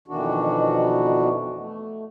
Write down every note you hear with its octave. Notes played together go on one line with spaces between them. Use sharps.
F2 B2 D#3 E3 D4 F#4
A3